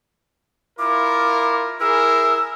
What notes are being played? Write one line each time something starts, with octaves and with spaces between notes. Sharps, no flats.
E4 F4 A#4 D6
E4 G#4 A#4 E6